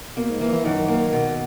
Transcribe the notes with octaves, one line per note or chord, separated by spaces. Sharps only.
B2 A#3
G#2
E3 A#3
E3
F#2 D#3
A#3
B2